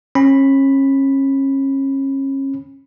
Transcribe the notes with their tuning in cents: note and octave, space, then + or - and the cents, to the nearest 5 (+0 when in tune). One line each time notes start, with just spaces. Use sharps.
C#4 -35 B5 +0